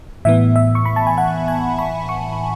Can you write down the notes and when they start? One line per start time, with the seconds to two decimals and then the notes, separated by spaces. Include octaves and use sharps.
0.25 A2 E3 B3 E5
0.56 E5
0.75 C#6
0.86 B5
0.96 A5
1.07 G#5
1.18 F#5
1.48 G#5
1.79 B5
2.09 C#6